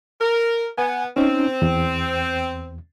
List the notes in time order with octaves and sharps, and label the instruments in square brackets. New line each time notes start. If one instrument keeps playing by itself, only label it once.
[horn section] A#4
[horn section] B3 [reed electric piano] G#5
[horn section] C4 [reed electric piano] C#4 D#4
[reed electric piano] E2